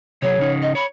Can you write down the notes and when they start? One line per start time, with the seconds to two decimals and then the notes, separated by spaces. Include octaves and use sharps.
0.22 C3 F#3 G#4 C#5
0.39 C#3 C#4 D#4
0.63 D#5
0.75 C#5 B5